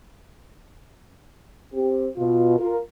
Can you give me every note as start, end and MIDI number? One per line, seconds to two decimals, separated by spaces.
1.74 2.08 60
1.74 2.08 67
2.17 2.55 47
2.17 2.55 65
2.58 2.77 65
2.58 2.77 70